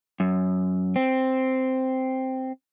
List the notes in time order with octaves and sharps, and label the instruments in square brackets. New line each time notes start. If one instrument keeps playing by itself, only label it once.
[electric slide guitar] F#2
C4